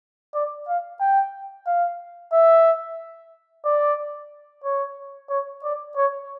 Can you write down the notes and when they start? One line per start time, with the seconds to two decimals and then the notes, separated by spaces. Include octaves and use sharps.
0.34 D5
0.68 F5
1.01 G5
1.67 F5
2.33 E5
3.65 D5
4.64 C#5
5.30 C#5
5.64 D5
5.96 C#5